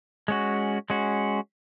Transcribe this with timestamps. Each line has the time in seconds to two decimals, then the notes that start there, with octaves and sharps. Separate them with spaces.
0.28 G#3 C#4 F#4
0.90 G#3 C#4 F#4